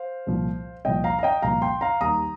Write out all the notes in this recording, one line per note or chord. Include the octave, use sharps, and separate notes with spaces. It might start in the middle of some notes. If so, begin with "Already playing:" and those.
Already playing: C5 F5
C2 A#2 F3
C2 A#2 F3 D#5 G5
F5 A#5
A#5
D#5 G5
C2 A#2 F3 F5 A#5
G5 C6
F5 A#5
D#2 D#3 G3 A#5 D#6